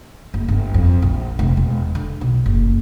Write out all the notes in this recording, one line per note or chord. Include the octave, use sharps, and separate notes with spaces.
F#1
G1
F2
A#1
F1
E1
D3
B1
F#1